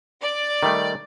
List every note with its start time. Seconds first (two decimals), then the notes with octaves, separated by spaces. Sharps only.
0.21 D5
0.63 D#3 G3 A3